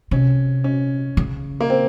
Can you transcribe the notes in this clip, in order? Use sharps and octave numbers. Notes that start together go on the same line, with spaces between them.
C3 C#4
C#4
C#3
A#3
C4